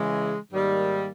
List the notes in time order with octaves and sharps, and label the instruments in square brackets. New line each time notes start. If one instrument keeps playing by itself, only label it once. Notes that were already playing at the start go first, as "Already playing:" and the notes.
Already playing: [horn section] C#3 E3 G#3
G#2 D#3 G3 A#3